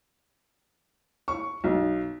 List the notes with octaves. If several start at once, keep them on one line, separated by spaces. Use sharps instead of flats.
C#6
B1